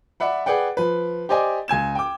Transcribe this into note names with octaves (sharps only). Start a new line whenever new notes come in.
D5 E5 F#5 B5
G#4 B4 D5 F#5 G5
F3 B4
G4 C5 D5 D#5 G#5
C#2 G#5 G#6 E7
G5 D6